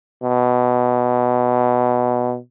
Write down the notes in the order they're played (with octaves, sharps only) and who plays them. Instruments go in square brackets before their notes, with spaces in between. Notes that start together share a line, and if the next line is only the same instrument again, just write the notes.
[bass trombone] B2